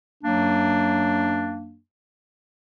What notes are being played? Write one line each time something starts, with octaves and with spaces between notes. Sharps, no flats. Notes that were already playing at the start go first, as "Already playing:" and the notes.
F#2 F#3 A#3 D4